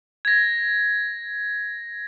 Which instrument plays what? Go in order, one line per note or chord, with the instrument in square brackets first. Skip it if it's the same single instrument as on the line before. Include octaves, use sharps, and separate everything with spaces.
[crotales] G#6 A#6